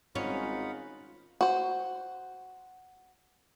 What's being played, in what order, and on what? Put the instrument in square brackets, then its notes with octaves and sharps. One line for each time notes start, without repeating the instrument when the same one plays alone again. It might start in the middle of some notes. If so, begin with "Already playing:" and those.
[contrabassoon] G#1 [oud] C#4 [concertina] D#4 F#5 B5 [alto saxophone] F4
[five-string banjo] F#4 C5